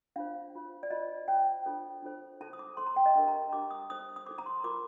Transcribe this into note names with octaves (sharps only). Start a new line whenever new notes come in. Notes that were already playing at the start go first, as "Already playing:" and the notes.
D4 F4 C5 F5
D4 F4 C5
D5
F4 C5 D#5
F4 C5 G5
D4 F4 A4 C5
D4 F4 A4 C5
D#4 A4 C5 A5
D#6
D6
D#4 A4 C5 C6
A#5
G5
D#5
D4 G4 A#4 G5
A#5
D4 G4 A#4 D6
D#6
D#4 A4 C5 D#6
D#6
D#4 A4 C5 D6
A#5
C6
F4 A#4 D6